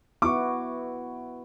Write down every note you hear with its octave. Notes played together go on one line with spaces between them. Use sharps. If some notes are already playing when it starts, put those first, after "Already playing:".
B3 E4 F#4 C#6 D6